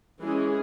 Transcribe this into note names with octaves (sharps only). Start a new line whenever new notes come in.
E3 G#3 C#4 G#4